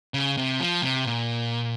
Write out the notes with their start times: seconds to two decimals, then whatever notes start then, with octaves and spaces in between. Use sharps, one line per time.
0.14 C#3
0.37 C3
0.60 F3
0.82 C3
1.05 A#2